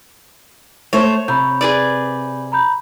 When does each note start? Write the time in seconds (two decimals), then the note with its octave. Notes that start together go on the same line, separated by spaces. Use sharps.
0.93 A3 C5 C#5 E5
1.28 C3 B5 G6
1.61 G#4 B4 D5
2.52 A#5 B5 G6